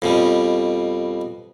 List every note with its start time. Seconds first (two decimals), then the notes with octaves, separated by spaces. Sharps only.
0.02 F2 B2 G3